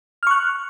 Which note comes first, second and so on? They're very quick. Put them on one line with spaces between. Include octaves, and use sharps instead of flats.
F6 C#6 F#6